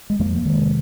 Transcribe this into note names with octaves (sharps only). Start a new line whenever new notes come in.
G#3
F2 F3 A#3
D#3 G#3
C3